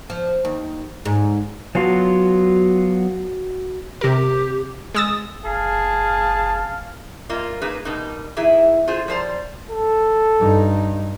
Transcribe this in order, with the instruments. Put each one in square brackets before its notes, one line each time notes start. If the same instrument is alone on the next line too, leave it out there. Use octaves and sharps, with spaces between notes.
[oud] F3
D#2
G#2
[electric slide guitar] F#3 B3 F4 [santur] F#4 A5
[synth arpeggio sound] C3 A#4 [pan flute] G4
[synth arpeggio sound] G#3 E6 A6 [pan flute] D#6
[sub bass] F#1 [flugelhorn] G#4 [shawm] F5 [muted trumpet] A5
[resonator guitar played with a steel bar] G3 A#3 F4 D#5
A#3 D#4 G#4 B4
B2 G3 A#3 D#4
E3 D#4 E4 G#4
F4 G#4 C5
F3 G3 C5 D5 A#5
[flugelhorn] A4
[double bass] G2 D#4